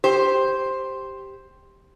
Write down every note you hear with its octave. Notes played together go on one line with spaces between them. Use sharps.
G4 C5